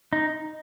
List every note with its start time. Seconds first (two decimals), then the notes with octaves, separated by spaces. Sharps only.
0.13 D#4